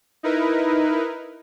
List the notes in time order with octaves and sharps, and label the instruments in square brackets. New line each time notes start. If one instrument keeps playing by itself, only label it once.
[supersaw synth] D#4 E4 A#4 B4